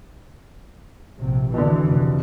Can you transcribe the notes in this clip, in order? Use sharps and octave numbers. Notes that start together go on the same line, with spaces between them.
A#1 C3
B2 D3 E3
F1